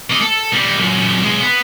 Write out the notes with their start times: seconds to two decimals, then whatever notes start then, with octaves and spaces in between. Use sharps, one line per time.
0.10 A#3 D#5
0.21 A4
0.53 G3 A#3
0.77 F#2 A#2
1.23 B1 G#3
1.40 B3